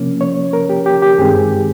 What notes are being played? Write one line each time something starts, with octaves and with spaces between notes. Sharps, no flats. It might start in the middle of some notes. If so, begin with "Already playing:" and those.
Already playing: C3 F3 A#3 C#4
C#5
A#4
G4
G4
G4
G2 D#3 G#3 C4 G#4
G4